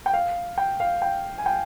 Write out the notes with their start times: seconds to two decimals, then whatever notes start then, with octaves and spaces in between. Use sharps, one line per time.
0.06 G5
0.13 F5
0.58 G5
0.80 F5
1.02 G5
1.38 G#5
1.46 G5